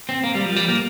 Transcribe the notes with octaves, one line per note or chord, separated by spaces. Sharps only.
C4
A#3
G3
F3
G3
A#3